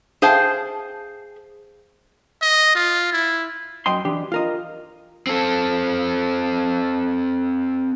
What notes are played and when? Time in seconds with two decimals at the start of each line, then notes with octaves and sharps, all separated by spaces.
0.22 G#4 C5 F5 G5 A5
2.42 D#5
2.75 F4
3.13 E4
3.86 F#2 D#5 G5 C6
4.05 E3 D4 G4
4.32 F4 A#4 D#5
5.27 C4 A4